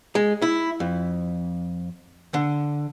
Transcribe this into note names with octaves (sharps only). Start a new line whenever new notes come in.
G#3
E4
F2
D3